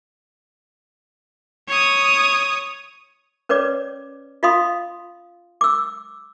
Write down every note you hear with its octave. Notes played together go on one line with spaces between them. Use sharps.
C#5 D#6
C#4 B4 C#5 D5 D6
F4 D#5 F5 B5 C6 D#6
D6 E6